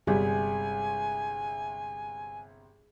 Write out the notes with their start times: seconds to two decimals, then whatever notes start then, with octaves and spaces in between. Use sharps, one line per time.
0.07 G1 C3 G3 G#4 G#5